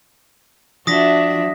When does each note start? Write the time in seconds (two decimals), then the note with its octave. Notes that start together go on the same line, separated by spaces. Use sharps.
0.87 F3 D4 F#4 E5 D#6 A#6 B6